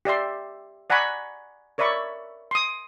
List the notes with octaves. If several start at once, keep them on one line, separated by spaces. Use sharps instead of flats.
G4 D5 E5 C6
D5 F#5 G#5 A#5 B5 C#6
A#4 C#5 D5 E5 B5 C#6
C6 D#6